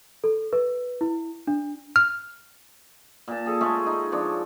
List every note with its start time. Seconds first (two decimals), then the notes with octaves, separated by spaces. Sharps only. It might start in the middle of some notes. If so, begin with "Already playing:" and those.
0.24 A4
0.53 B4
1.01 E4
1.47 D4
1.96 F6
3.28 A#2 A5
3.46 G#4 A4 A5
3.61 G#3 A3 C#4 G#4
3.86 D#4
4.12 F3 D4 C#5